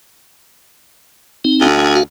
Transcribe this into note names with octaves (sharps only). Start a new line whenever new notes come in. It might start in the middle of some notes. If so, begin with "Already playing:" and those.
C4 D#4
D2
G#5
F#4 F5